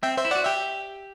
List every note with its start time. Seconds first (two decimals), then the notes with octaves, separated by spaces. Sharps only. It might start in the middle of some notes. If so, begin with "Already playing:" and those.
0.03 C4 E5 G5
0.17 C5 E5
0.25 E4
0.31 F#4 D5 F#5
0.45 G4 E5 G5